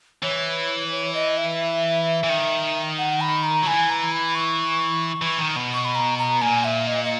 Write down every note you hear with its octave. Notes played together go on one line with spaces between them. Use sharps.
E3 C#5
C#5
D#5
E5
E3
D#3
F#5
B5
A#5
F#3
E3 G#5
A#5
B5
C#6
E3
D#3
B2
C#6
B5
A#5
A#5
A#2 G#5
E5
D#5
D#5